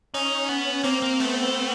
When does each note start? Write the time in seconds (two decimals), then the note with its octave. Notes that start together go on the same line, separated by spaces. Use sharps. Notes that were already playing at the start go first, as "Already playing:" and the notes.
0.14 C#4 D#4
0.49 B3
0.84 A#3 C4
1.02 A#3
1.20 A3 B3